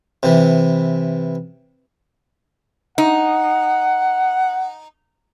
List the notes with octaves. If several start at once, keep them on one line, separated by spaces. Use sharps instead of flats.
C3 E3
D#4 F#5